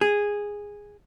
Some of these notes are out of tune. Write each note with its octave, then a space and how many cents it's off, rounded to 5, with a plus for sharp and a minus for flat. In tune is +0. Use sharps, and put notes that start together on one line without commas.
G#4 -10